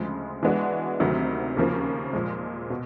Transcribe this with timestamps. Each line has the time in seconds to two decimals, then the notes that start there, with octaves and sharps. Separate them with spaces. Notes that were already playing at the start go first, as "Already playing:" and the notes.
Already playing: D2 C#3 F3 G#3
0.43 E3 G#3 B3 D4 F#4
1.00 D2 C3 D#3 F#3
1.57 D#2 C#3 F3 A#3
2.13 A#2 F3 G#3
2.70 B2